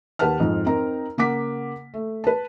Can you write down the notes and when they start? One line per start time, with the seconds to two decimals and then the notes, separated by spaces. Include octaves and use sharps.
0.19 D#2 G4 B4 F#5 A5 F6
0.40 F2 G#2 F3
0.66 C4 D#4 A#4 A#5
1.18 C#3 A#3 F#5 D6 B6
1.94 A3
2.24 B4 A5